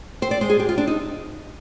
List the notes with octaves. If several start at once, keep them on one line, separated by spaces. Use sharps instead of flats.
C4 C5
D5
G#3 C5
G#4
G#3 G4
F4
C4 D4
D#4